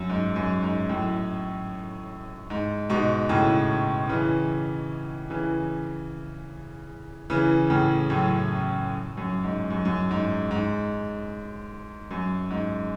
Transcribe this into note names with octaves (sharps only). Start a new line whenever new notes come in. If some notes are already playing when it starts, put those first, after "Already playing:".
Already playing: F#2
G#2
F#2
G#2
F#2 A2
G#2
G#2 B2
A2 C#3
C#3 E3
C#3 E3
C#3 E3
A2 C#3
F#2 A2
F#2
G#2
F#2
F#2
G#2
G#2
F#2
G#2